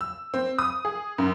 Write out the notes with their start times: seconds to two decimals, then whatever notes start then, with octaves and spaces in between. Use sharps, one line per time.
0.01 E6
0.34 C4
0.59 D#6
0.85 G#4
1.18 F#2